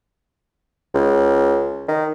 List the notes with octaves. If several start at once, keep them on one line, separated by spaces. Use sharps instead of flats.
C#2
D#3